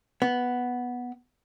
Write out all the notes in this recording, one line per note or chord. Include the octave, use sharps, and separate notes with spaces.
B3